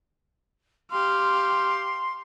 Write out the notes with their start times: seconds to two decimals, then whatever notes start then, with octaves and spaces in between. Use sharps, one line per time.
0.91 G4 F5 C6